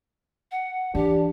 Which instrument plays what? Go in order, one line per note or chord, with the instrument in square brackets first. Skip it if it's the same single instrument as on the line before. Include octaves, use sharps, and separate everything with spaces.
[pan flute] F#5
[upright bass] E3 [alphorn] D4 [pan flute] G4